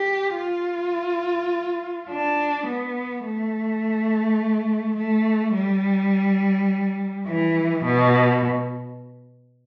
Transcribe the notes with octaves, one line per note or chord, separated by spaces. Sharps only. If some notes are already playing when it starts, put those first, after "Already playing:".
Already playing: G4
F4
D4
B3
A3
A3
G3
E3
B2